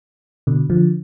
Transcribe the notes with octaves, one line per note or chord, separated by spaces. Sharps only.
B2 D3
D3 F3